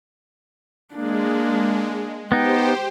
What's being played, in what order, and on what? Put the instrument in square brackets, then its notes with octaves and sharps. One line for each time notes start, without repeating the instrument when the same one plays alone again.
[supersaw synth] G#3 [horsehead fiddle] A#3 D4
[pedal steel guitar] B3 D#4 [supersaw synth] G4 C5 [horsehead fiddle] G5